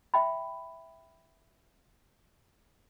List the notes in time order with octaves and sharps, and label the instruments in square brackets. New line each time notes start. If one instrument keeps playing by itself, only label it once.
[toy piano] E5 G5 B5